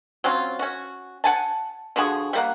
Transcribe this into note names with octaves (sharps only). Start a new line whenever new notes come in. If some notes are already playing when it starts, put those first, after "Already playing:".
F#3 C4 C#4 F4
C#4 F#4
F#5 G#5 A5
D3 F3 F#4 G#4
G3 A#3 F#5